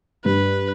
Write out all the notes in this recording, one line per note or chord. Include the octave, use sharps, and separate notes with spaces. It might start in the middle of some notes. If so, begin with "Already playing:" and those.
G2 B4